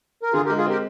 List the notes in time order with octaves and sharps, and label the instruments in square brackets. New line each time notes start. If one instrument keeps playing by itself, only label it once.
[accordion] A#4
[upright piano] D3 [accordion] F4 G#4
[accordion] G4 A#4
[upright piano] G#3
[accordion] F4 G#4
[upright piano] C4 [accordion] G4 A#4